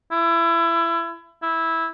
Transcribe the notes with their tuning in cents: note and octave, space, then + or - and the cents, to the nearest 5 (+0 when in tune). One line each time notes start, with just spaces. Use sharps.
E4 +25
E4 -10